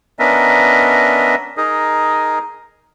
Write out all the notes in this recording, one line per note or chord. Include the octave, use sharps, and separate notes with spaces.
B3 C#4 D4 A#4 D#5 E5
D#4 G#4 A#4